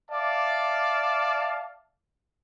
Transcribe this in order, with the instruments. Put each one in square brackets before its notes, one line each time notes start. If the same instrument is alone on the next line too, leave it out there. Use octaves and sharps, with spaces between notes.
[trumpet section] D5 E5 F5 A5 D6